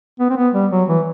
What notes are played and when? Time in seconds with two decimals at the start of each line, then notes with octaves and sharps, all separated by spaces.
0.20 B3
0.30 C4
0.37 B3
0.54 G3
0.71 F#3
0.88 E3